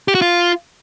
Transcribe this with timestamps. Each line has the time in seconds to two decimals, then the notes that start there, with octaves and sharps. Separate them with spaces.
0.08 G4
0.15 F#4
0.22 F4